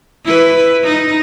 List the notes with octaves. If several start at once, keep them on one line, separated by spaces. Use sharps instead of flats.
E4 B4
D#4